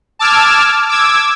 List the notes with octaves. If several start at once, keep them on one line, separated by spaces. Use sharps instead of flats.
A5 D6 E6 F6 G#6
D6 E6 G#6